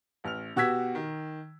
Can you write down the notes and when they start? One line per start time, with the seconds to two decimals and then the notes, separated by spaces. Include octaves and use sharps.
0.24 A1 F6 F7
0.56 B2 F#4 G4 E6 G#6 B6
0.95 D#3